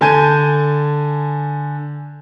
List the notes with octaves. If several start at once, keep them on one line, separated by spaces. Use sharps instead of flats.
D3 G#5 A5 G6 G#6 D#7